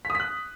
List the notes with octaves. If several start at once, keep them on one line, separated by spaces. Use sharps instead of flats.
B6
D#6
B6
F#6